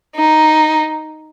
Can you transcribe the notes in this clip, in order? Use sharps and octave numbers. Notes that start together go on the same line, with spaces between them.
D#4